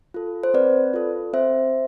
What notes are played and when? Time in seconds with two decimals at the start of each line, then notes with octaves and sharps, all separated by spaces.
0.14 F4 A4
0.43 C5
0.54 C4 B4 D5
0.94 F4 A4
1.33 C4 C5 E5